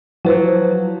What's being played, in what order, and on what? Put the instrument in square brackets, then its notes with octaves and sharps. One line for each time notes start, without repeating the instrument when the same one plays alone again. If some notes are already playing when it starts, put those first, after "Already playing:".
[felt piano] F3 [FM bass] F#3 [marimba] E4 B4 C5